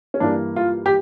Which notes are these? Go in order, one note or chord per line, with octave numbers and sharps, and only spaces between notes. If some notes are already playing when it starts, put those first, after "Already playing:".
C#4
G2 E3 A#3 D4
F4
G4